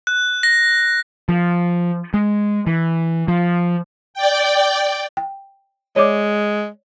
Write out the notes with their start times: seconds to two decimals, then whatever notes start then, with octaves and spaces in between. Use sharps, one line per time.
0.07 F#6
0.43 A#6
1.29 F3
2.14 G#3
2.67 E3
3.28 F3
4.14 D5 G5
5.17 G5
5.96 G#3 C#5 D5 D6